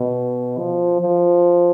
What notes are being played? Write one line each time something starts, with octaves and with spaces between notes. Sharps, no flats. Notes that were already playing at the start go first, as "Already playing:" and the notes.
Already playing: B2
F3
F3